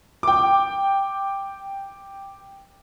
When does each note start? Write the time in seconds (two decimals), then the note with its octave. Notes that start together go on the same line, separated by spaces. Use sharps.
0.23 G5 D6